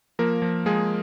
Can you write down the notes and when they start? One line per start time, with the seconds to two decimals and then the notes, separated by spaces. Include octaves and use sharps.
0.19 F3 A#3 A#4
0.42 F3
0.66 F3 G#3 G#4